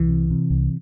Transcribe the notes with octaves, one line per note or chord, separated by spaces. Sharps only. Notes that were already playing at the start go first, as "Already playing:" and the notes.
Already playing: C2 E3
C3
C3
C2